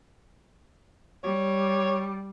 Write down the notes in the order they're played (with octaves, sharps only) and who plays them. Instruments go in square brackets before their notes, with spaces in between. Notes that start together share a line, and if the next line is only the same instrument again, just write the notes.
[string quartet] G3 [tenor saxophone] C#5